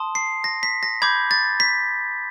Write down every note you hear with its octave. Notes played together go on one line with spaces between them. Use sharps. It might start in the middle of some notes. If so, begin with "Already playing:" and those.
Already playing: A5 C6 D#6
C7
A#6
B6
A#6
B5 D6 G6 G#6
A6
B6